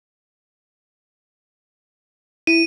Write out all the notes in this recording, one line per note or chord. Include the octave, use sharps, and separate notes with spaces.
E4 D#7